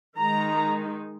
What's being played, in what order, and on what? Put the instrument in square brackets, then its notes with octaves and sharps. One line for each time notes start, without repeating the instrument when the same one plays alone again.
[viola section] D#3 G#3 D#4 A#5